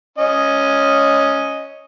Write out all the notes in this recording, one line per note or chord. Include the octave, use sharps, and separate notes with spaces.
C#4 D#5